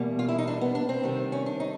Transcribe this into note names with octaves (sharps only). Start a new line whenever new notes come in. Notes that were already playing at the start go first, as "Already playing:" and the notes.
Already playing: E2 B2 G3 A#3
F4
E4
D#4
D4
B3
D4
C4
C3 D#3 G3
C#4
D4
D#4